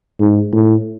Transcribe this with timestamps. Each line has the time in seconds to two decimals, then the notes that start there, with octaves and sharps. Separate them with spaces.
0.20 G#2
0.53 A2